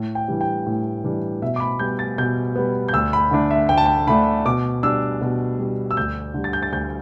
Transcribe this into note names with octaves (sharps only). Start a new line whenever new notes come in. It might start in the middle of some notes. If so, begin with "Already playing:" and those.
Already playing: A2
G5
E3 G3 D4
G5
A2
E3 G3 D4
B2 E5
D6
B5
G3 B3 G6
A6
B2 G6
G3 B3
G6
D2 E6
B5
D3 A3 D4
E5
D2 G5
A5
G5
D3 A3 D4 B5
B2 D6
G3 D4 E6
B2
G3 D4
E6
D2 G6
D3 G3
A6
G6
A6
D2 G6